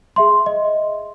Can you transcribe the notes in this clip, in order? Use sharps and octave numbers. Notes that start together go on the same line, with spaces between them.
G#4 E5 C6
D#5